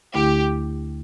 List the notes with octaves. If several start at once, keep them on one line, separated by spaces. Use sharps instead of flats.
D2 D3 A3 E4 G4